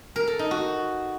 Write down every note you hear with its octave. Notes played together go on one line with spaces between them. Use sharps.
A#4
A4
D#4
F#4